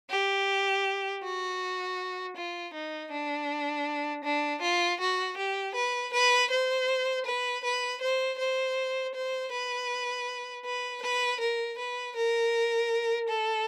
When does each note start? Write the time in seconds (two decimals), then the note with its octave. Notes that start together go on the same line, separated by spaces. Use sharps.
0.10 G4
1.24 F#4
2.36 F4
2.74 D#4
3.11 D4
4.24 D4
4.62 F4
5.00 F#4
5.37 G4
5.75 B4
6.14 B4
6.51 C5
7.26 B4
7.64 B4
8.01 C5
8.39 C5
9.15 C5
9.52 B4
10.65 B4
11.03 B4
11.40 A#4
11.78 B4
12.16 A#4
13.29 A4